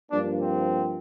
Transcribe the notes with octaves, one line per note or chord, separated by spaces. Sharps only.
G2 F3 A#3 D4
C4